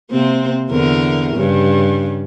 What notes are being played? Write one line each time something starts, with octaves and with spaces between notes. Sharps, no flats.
C3 A#3 C4
E2 D3 A#4
G2 C#3